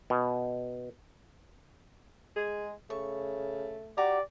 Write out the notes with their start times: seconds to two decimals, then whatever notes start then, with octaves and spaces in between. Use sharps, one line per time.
0.10 B2
2.36 G#3 G#4
2.90 C#3 A3 C#6
3.97 F#4 G4 D5 A#5 D6